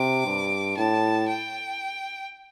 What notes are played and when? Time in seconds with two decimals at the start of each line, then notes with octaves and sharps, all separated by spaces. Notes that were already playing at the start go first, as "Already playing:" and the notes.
Already playing: C3 D6
0.26 G2
0.77 A2 A5
1.28 G5